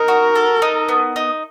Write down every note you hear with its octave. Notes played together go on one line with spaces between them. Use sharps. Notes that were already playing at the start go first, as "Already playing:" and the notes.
Already playing: D#4 A#4
F#4
A4
D#4
B3
D#4